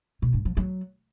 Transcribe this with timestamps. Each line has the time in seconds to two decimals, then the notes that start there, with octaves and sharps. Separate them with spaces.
0.22 B2
0.34 G2
0.45 F3
0.57 F#3